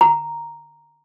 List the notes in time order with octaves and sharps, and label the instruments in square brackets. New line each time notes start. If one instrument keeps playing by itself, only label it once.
[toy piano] A#5